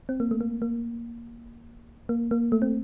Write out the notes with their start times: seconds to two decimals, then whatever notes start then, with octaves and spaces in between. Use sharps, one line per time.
0.09 C4
0.20 A#3
0.31 A3
0.41 A#3
0.62 A#3
2.09 A#3
2.31 A#3
2.52 A3
2.62 C4